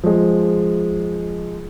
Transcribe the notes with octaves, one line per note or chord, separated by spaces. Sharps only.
F3 G#3